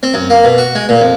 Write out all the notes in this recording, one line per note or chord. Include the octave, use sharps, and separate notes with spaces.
C4
F#2
A#3
B2
F#4
G#3
A#2
F2